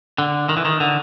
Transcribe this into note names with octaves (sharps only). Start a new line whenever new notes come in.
D3
D#3
E3
D#3
D3